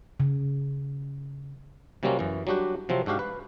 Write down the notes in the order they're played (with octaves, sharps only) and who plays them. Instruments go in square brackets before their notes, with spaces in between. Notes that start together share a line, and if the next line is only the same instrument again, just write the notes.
[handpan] C#3
[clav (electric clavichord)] C3 F#3 G3 A#3 C4 C#4
F#2 E3
F#3 G3 D4 F#4 G4
C3 F3 F#3 C4
G#2 D4 F#4 G4 F5
B4